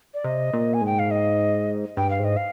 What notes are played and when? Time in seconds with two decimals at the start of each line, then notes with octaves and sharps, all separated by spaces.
0.14 D5
0.24 C3 D#5
0.53 A#2
0.74 G#5
0.81 G#2 G5
0.99 F5
1.11 D#5
1.97 G2 G5
2.10 F5
2.20 G#2 D#5
2.37 F5